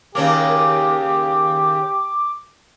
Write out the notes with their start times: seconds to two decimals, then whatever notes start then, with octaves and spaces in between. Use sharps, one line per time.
0.15 D#2 C#3 A#3 G4 D6